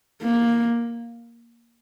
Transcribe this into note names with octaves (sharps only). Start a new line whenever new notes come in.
A#3